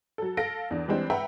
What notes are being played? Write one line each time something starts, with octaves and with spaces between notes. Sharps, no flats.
F#3 A4
A4 F5 A#6 D7
E2 D4
E3 G3 G#3 C4 D4
B4 E5 F#5 G5 A#5 B5